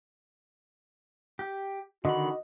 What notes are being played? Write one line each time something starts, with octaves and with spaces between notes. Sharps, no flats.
G4
D3 D#3 F#4 D#5 B5